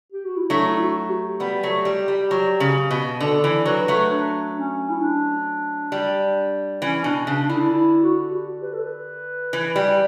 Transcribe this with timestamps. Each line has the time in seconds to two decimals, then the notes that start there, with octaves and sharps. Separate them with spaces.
0.12 G4
0.25 F#4
0.37 E4
0.50 F#3 A3 D4
0.70 E4
0.80 F#4
1.10 G4
1.40 G3 B3
1.63 F#3 A3
1.85 G3
2.08 G3
2.31 F#3
2.60 C#3
2.91 B2
3.20 D3 A4
3.44 E3
3.66 F#3 B4
3.88 F#3 A3
4.11 D4
4.57 C#4
4.90 E4
5.01 D4
5.92 G3
6.82 E3 C#4
7.04 B2 D4
7.27 C#3 D4
7.43 D4
7.49 D3 E4
7.72 E4
8.03 F#4
8.32 G4
8.63 B4
8.74 A4
8.85 B4
9.53 E3
9.76 G3